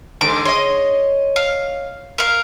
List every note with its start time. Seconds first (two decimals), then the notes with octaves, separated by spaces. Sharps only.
0.21 G#2 D3 G#3 D6
0.45 C#5 D#5 C6
1.36 F5
2.18 A#4 F5